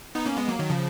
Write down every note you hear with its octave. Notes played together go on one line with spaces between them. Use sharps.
B3 D#4
A#3 C#4
G#3 B3
F#3 A#3
D#3 F#3
C#3 F3